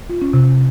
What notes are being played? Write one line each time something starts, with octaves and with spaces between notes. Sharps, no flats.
F4
C#4
C3